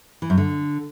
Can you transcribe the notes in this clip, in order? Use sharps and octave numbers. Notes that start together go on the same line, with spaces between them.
E3
F#2
D3